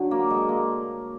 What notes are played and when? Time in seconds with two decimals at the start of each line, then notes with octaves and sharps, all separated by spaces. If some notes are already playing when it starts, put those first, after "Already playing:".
Already playing: D3 F#3
0.11 A#3
0.30 G#3
0.49 A#3